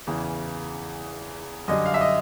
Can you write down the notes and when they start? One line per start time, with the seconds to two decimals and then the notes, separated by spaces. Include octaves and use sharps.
0.07 E2 C#3 E3
1.68 F#2 D3 G3 D#5
1.86 F5
1.94 E5
2.01 D#5